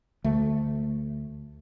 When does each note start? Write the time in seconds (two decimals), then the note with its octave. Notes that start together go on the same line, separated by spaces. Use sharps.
0.24 D2 A3